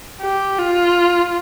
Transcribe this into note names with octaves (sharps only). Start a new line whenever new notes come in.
G4
F4